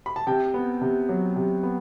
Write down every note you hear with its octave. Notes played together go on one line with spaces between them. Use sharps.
B5
A5
C3 G5
B3
C3
F#3
C3
B3